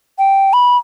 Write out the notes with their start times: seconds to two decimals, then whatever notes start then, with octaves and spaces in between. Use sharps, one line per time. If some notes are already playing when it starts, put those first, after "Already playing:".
0.19 G5
0.53 B5